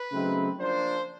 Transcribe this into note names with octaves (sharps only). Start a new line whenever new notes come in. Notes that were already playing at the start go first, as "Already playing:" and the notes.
Already playing: B4
C#3 F#3 A3 C4 D#4
F3 A#3 D4 C5